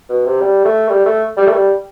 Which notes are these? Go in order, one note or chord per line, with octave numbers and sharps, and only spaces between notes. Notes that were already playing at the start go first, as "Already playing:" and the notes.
B2
C3
G3
A3
G3
A3
G3
A3
G3